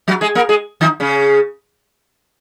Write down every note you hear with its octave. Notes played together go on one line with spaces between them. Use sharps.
F#3 F#4
G#3 G#4
A#3 A#4
G#3 G#4
D#3 D#4
C#3 C#4